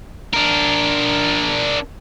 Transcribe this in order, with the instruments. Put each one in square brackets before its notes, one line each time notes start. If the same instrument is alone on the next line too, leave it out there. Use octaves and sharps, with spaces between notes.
[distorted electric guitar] D4 A#4